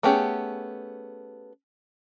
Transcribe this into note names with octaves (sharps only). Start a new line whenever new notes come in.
A3 B3 C#4 G4 G#4